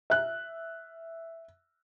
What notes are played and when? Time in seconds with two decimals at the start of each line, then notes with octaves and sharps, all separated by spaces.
0.10 E5 F#6